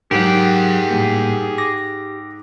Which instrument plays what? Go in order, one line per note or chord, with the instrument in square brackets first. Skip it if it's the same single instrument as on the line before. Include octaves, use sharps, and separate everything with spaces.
[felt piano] G#2 [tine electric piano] F#3 A#4 [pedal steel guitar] G4 [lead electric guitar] G#4 F#5
[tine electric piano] A2 G3 A#3
D6 A#6